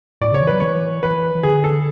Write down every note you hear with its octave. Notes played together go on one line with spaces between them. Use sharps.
A2 D5
C#3 C#5
E3
F#3 B4
E3 C#5
E3 B4
E3
D3 G#4
A4